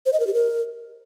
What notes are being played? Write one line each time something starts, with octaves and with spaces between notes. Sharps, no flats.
C5
D#5
A#4
G4
A#4